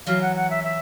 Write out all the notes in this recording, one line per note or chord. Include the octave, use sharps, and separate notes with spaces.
E3 F#3 F5
F#5
F#5
E5
E5